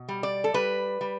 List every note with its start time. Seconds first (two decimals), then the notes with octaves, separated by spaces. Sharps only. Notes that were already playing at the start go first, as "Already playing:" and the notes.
Already playing: B2
0.09 G3
0.23 D5
0.44 A4
0.54 G3 B4
1.01 G3